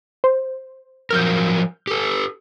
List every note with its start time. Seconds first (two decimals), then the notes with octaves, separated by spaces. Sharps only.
0.24 C5
1.10 F3 F#3 A#4 F6 G6
1.87 G4 A4